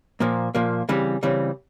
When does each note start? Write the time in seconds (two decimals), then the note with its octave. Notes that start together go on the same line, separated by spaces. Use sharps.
0.20 A#2 F3 A#3
0.55 A#2 F3 A#3
0.89 C#3 E3 G3 C4
1.23 C#3 E3 G3 C4